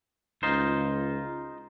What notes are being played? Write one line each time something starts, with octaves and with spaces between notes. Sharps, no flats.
C#2 D#4 F4 C5